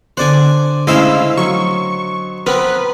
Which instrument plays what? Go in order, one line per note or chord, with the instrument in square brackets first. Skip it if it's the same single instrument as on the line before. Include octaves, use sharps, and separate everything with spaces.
[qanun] D3 F#5 [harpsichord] C5 D5 G#5
[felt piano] C#3 G#3 A3 [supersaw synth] E4 F5 E6 [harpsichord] C5 D#5
[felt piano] F#3 [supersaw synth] C#6
[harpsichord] B3 C4 [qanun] A#4 [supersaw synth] B4